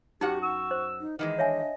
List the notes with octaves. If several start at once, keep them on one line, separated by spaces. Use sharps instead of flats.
F#2 D#4 F#4 G4 F#5
C#6 E6
C5
D#4
D#3 E3 G#3 D#5
D4 C#5 E5 G#5